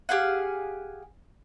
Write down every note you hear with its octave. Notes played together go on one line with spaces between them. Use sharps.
G4 G#4 F5 F#5